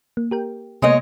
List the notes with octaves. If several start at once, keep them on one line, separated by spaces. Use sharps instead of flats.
A#3
G4 A#4 G5
C3 G#3 A#3 B3 C#5 D#5